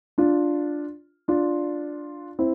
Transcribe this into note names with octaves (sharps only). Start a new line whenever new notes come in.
D4 F4
D4 F4
C4 E4